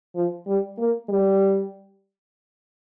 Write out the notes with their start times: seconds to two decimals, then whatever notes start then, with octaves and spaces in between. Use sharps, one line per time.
0.15 F3
0.47 G3
0.78 A#3
1.09 G3